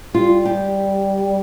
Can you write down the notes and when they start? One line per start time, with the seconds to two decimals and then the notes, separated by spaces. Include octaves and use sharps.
0.14 G3 F4
0.45 G4